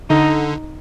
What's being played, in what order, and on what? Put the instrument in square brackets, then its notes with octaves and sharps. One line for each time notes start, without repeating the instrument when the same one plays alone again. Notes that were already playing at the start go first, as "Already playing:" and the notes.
[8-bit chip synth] D3 [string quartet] D#4